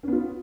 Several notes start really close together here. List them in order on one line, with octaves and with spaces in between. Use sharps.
C#4 B3 F4